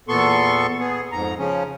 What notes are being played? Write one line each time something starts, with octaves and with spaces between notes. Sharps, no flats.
E2 A#2 B3 A4 C6 C#6
B3 G#4
F2 G#2 A#5
C#3 F3 C#4